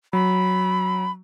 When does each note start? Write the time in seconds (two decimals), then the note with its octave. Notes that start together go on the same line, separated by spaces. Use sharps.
0.13 F#3 B5